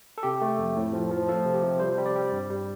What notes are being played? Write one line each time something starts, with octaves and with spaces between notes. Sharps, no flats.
A4
C3 G4
A3
F2
A2
F3
F3
F3 A4
C3
G4
C3
G3 C5
G3
D5
G3
G2
G3